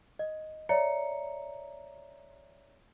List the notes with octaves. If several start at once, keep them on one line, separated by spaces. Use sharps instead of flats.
D#5
C#5 D5 E5 A#5 C#7